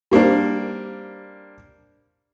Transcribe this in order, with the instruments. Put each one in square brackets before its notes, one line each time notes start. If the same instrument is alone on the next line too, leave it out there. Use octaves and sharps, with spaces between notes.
[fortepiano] G3 A#3 C4 D4